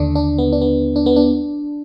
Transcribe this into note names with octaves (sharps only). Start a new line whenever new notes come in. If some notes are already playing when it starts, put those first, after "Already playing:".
Already playing: D#2 D3 D4
D4
B3
D4
B3
D4
B3
D4